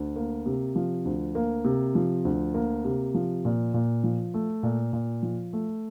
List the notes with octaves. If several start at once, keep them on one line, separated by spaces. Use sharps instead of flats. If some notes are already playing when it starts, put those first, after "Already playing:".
Already playing: D2
A#3
C3
F3
D2
A#3
C3
F3
D2
A#3
C3
F3
A#2
A#2
F3
A3
A#2
A#2
F3
A3